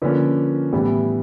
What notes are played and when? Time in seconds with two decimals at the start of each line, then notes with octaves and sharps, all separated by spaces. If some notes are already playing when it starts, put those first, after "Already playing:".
0.02 D3 F3 A#3 C#4 B4
0.73 A2 E3 G3 B3